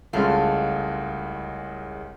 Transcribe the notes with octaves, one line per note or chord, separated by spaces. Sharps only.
C2 C#3 G#3 A3 F4